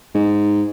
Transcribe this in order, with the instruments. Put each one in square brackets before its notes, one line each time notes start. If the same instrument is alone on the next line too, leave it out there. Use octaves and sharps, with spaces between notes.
[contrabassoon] G#2